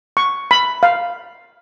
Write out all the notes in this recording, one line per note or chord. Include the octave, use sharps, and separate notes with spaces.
C#6
B5
F5